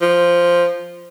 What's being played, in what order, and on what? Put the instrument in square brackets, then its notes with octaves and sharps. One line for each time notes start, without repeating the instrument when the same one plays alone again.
[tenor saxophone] F3